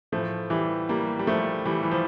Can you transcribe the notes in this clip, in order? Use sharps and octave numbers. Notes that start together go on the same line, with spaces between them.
A2 E3 F3 A3
E3 G3
G3 A#3
G3
F3 A3
E3 G3
E3
F3